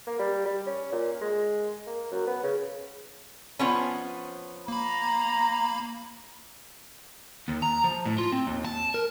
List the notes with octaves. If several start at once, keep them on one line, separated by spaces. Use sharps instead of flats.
A#3
G3
G3
C#4
A#2
G#3
A#3
F#2
B3
C#3
F3 B3 C#4
A#3 A#5 B5
D#2
A#5
F3
A2
F4
C4
D#2
A5
A#4